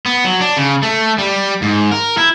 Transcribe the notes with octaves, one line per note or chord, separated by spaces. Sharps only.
B3
F#3
D4
C#3
A3
G3
G#2
A#4
E4